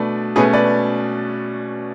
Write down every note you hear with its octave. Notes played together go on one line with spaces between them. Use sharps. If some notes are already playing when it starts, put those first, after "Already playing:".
Already playing: B2 A3 D4 B4 D5
B2 A3 C#4 G#4 B4
B4 D5